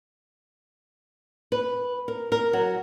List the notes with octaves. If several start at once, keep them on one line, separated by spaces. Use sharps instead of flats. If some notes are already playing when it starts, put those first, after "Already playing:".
B4
A#4
A#4
F#3